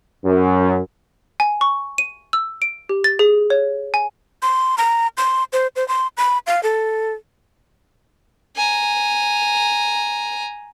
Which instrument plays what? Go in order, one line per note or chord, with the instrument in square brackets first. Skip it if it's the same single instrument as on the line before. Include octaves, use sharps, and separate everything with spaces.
[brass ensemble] F#2
[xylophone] G#5
C#6
D#7
E6
D7
G4
A6
G#4
C#5
G#5
[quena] C6
A#5
C6
C5
C5
C6
B5
F5
A4
[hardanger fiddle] G#5 A#5